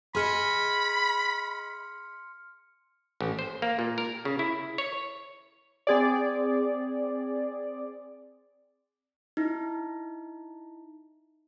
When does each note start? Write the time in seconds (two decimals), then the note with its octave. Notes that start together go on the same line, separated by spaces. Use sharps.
0.15 G#4 D#5 E5 B5 C6 F6 C#7
3.21 A1
3.39 C5
3.62 A#3
3.79 A#2
3.98 A#4
4.25 C#3
4.39 E4
4.78 C#5
5.87 C4 G#4 D5
9.37 D#4 E4